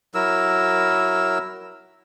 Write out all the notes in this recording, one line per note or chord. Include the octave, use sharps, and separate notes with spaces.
F#3 E4 A#4 E6